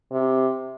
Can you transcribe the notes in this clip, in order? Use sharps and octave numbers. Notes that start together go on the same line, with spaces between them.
C3